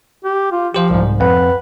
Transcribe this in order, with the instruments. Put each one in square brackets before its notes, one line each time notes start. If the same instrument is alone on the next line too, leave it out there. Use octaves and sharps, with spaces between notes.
[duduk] G4
F4
[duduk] F3 [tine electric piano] G4 C5 F5
[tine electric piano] C2 G#2
[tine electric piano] F2 F#5 [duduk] B4